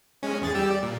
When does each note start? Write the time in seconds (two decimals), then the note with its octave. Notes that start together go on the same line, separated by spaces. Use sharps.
0.23 G#3 C#4
0.41 E2 G#4 A6
0.54 G3 G4 E6
0.71 D5
0.83 A#2